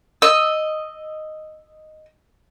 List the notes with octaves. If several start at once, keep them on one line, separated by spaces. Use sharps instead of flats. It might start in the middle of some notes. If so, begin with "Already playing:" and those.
D#5 E6